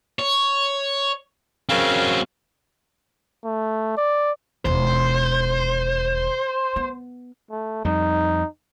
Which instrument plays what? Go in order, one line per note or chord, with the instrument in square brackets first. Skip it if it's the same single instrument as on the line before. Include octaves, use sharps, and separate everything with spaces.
[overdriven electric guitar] C#5
[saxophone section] C#3 A#4 F5 [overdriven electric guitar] F#3 C4
[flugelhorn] A3
D5
[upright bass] E1 D#2 [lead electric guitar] C5
[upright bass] B3
[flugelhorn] A3
[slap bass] F2 G3 [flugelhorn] D#4